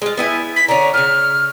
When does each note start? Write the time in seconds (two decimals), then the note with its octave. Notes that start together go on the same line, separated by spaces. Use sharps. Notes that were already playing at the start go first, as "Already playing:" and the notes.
0.02 G#3 F4
0.17 B3 E4 G#5
0.56 B6
0.68 D3 C#4 A#5
0.94 A#2 C#3 F6